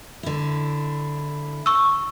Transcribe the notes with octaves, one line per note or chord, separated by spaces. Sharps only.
D3 E4
C#6 E6